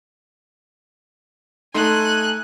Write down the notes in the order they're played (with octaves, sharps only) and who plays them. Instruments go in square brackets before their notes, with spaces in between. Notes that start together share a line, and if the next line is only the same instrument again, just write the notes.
[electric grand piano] A3 D#4 C6 [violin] G#5 F#6